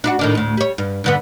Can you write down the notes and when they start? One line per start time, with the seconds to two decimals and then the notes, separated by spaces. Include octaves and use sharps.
0.04 D4 E4 F#4
0.19 A2 D#3 D4
0.35 D2 A2
0.57 G3 C#5
0.78 G2
1.04 G2 D3 B3